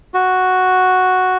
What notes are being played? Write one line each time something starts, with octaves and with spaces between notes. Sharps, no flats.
F#4